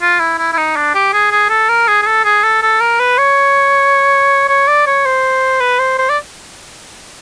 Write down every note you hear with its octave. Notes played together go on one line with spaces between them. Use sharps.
F4
E4
E4
E4
D#4
D4
G4
G#4
G#4
A4
A#4
G#4
G#4
A4
G#4
A4
A4
A#4
B4
C#5
C#5
D5
C#5
C5
B4
C5
C5
D5